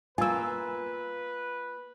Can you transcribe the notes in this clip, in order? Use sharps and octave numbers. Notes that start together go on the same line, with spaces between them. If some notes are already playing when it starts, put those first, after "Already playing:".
A#3 F4 B4 G#5 E6